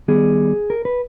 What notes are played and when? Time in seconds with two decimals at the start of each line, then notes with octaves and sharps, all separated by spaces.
0.08 D#3 G3 B3 G#4
0.70 A#4
0.85 B4